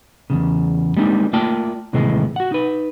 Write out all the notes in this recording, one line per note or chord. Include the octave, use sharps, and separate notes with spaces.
E2 A2 C#3
G3 G#3 A#3 C4 D4 D#4
A3 A#3 F4 D5 G5 A5
D#2 A2 C3 E3 G#3
F#4 F#5
D#4 B4